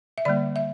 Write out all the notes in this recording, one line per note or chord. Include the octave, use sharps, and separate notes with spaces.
E5
D3 G3 A#3 D5
E5